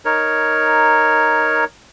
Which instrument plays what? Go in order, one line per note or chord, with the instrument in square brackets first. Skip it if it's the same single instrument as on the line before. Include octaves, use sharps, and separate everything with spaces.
[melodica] D#4 A#4 C#5